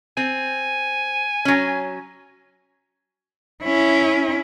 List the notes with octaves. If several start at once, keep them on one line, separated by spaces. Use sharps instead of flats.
C4 G#5
F#3 C#4
C#4 E4